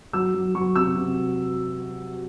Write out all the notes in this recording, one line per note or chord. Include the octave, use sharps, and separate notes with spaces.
F#3 E6
F#3
F#3 C#6
C3 E6
C3